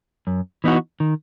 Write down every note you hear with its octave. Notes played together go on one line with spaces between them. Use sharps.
F#2
E3 B3 D#4 F#4
D#3